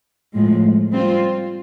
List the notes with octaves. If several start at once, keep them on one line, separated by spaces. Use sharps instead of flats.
A2 F3 G#3
G3 C4 F4